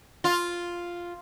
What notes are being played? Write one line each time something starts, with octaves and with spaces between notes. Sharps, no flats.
F4